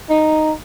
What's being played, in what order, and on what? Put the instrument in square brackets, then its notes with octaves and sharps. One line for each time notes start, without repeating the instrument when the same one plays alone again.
[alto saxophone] D#4